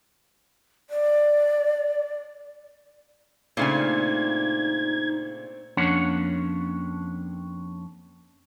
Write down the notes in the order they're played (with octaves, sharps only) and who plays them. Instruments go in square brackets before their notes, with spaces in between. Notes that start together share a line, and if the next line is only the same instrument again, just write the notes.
[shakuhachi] D5
[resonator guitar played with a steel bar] A#2 C#3 G#5 [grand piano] A3 C4 D4 [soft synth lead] D#4 [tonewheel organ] G#6
[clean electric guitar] F2 A#3 C#4 D4 C#5 F#5